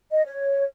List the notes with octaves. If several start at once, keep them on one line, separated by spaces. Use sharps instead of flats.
D#5
C#5